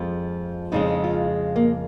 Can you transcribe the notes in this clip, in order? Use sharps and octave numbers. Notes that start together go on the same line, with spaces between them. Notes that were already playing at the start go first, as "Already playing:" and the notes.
Already playing: F2 F3 G#3
F2 C#3 G#3 D#4
F4
A#3